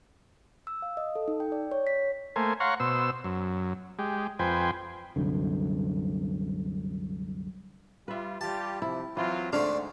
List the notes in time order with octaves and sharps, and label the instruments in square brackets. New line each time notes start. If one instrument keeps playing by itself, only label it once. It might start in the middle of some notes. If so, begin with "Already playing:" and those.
[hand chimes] E6
F5
D#5
A4
D#4
G5
D5
C#5
B6
[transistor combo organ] A3 A#3 C5 G#5
C#5 F5 F#5 A#5 C6 C#6
B2 C5 E6
F#2
G#3 G4
F2 B4 C5 G5 G#5
[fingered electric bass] C2 F#2 D3
[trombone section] G3 F4 [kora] B4 E5
[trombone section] G3 F4 G4 [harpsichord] A5
[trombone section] C3 F3 [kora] E4
[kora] E3 [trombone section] F#3 C4 F4
[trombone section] D2 G#2 [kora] D3 F5 F#5 [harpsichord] A3 C4 D4